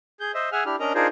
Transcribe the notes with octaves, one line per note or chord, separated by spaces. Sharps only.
G#4 G6
C5 D#5 E5
G#4 E5 F#5 G#5 F6
D4 E4 G4 F6
C#4 D4 A#4 D#5 A#5
D4 D#4 F4 G#4 A#4 C5